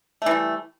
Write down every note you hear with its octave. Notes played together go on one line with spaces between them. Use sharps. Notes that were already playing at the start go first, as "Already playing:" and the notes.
E3 G3 A3